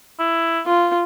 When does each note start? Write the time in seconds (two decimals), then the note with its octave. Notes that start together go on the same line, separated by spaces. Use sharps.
0.19 E4
0.66 F4